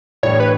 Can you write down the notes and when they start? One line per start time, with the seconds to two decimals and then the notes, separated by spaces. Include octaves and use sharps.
0.23 A2 E3 G3 D4 C#5
0.40 B4